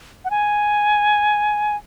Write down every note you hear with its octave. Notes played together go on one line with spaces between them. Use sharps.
F#5
G#5